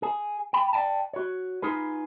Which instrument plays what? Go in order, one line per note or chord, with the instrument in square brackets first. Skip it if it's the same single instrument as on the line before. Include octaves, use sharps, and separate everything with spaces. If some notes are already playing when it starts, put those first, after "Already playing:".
[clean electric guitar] G#4
G5 B5
D5 E5 G5 A5
F#4 C#5
D#4 F4 G#4 B4